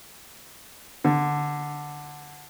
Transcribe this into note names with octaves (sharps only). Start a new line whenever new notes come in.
D3